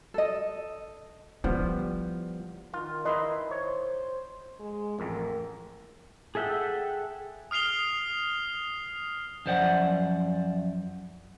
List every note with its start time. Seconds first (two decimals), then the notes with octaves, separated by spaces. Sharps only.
0.14 A4 D#5
1.44 F3 G3 B3 E4
2.74 D#3 F4
3.05 D#4 E4 B4 D#5 C6
3.51 C5 C#5
4.60 G#3
4.99 A1 F2 A#4
6.35 G#4 A4 E5 F#5 G5
7.51 D#6 F6 C7 F7 G7
9.46 F#2 F3 C5 D5 F#5